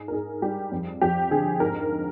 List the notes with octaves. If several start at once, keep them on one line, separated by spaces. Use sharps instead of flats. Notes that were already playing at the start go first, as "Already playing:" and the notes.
Already playing: G#2 G#4
A#4
G#2 G#4
G3 G4
F2
F2 G4
D3 G#4
G#2 A#4